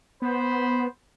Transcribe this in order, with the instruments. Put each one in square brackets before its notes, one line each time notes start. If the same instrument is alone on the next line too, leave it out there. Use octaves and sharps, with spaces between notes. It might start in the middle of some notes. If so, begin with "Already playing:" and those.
[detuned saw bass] B3 [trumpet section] C5 B5